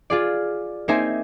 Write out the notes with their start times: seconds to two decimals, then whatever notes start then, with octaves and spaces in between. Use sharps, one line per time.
0.10 F4 G#4 D5
0.88 A#3 C4 D#4 C5 E5 G#5